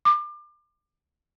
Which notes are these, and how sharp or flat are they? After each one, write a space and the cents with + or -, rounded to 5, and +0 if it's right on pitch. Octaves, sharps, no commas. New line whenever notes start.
D6 +30